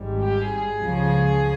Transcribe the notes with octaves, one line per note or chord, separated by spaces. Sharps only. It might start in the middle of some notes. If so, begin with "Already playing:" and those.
Already playing: G#1 G#2 G3
G4
G#4
C#2 C#3 F3